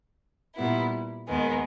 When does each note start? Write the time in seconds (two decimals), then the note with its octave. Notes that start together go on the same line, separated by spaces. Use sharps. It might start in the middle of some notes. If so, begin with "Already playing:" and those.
0.55 A#2 G3 B3 E4
1.26 D#2 D#3 G#3 B3